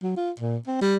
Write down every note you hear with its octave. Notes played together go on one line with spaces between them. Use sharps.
F#3
F4
A#2
C4
G3